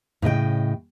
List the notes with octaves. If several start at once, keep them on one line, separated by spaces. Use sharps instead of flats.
A2 C#3 D#5 G5